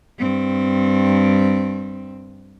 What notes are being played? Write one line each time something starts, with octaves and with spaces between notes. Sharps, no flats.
G2 C4